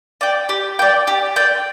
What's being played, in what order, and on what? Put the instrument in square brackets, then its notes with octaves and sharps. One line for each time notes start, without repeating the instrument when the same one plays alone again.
[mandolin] D5 G5
G4
D5 G5
G4
D5 G5